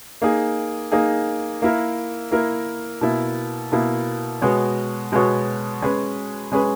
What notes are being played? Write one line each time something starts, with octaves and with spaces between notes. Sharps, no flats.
A#3 D#4 G#4
A#3 D#4 G#4
A#3 E4 A#4
A#3 E4 A#4
B2 A#3 E4
B2 A#3 E4
B2 G#3 B3 F#4 C#5
B2 G#3 B3 F#4 C#5
G#3 C#4 G#4 B4
G#3 C#4 G#4 B4